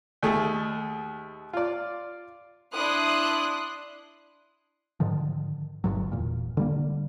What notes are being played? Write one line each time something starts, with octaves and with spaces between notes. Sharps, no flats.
D#2 A3 G#4
F4 D5
D4 E4 C6 D#6 F#6
G#2 D3 D#3 F3
G1 D2 G2 F#3
E1 A#2
D3 G3 A#3